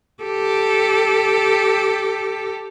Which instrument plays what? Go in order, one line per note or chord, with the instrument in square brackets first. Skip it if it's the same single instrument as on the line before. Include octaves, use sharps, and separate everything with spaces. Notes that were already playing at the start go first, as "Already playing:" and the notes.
[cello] G4 A4